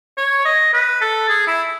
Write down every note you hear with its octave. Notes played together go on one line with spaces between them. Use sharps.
C#5
D#5
B4
A4
G#4
E4